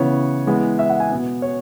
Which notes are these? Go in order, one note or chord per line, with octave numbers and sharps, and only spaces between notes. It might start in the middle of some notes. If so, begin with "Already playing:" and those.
Already playing: C#3 E3 B3 C#5
E3 G#3 B3
E5
F#5
G#5
B2 B3
C#5